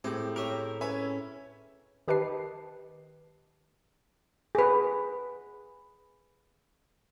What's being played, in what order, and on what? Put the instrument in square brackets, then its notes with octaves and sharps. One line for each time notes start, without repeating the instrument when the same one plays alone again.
[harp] A2 G#4 [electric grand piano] C4 [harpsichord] G4
[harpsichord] C#4 G4 [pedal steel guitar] A#4 E5
[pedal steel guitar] C#4 [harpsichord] B4 [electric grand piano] C#5 E5 G#5
[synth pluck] D#3 G4 B4 D#5 A5 C7
[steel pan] G#4 B4